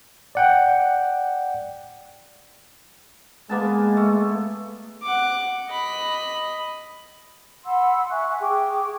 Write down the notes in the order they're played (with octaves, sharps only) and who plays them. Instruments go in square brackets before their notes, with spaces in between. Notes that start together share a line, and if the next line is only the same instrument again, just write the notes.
[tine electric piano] D5 F#5 G5
[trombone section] G#3 [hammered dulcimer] A#3 B3 A5
[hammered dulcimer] A3
[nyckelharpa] F#5 D6
D#5 B5
[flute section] F#5 B5 C6 E6
E5 G#5 C#6 F#6
G#4 G5 C#6 D6